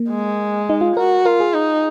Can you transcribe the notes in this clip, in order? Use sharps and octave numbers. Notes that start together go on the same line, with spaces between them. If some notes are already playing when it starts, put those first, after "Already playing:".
Already playing: A#3
G#3
D#4
F4
F#4 A#4
F4 A#4
G#4
D#4